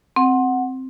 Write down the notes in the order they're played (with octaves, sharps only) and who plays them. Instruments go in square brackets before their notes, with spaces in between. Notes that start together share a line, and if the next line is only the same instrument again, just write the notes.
[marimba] C4 [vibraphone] F#5